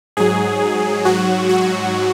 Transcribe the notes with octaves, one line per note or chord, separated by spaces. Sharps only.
G#2 F#3 G#4
G#2 F#3 F#4
F#4